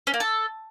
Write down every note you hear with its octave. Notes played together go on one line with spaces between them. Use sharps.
C#4
A#3
A4